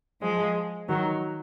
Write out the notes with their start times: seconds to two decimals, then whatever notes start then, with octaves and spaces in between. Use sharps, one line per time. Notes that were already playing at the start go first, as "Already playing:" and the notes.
0.21 F3 G#3
0.88 D#3 F#3